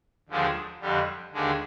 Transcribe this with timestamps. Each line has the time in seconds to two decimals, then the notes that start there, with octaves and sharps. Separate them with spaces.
0.29 D#2 D3 F3 G#3 D4
0.81 F2 D3 G3
1.33 D#2 D3 G#3 D4